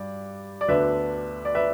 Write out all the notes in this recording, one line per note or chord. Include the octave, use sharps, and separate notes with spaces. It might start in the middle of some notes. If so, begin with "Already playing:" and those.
Already playing: G2 D5
D5
D2 D3 B3 D4 B4 E5
D5
B4 E5